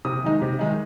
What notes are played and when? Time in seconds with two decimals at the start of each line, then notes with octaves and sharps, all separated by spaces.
0.05 C3 D#6
0.24 D#3 G#3 D#4
0.42 C3
0.59 D#3 G#3 D#4